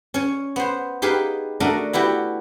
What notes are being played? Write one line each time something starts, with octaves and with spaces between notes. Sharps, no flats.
C#4 C#5
B3 C5
D#4 G4 G#4 B4 F5
A3 D4 F#4 A#4 D#5
B3 E4 F#4 G4